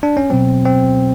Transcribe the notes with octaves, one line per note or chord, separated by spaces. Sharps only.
D4
C#4
B2 F#3 C4
C4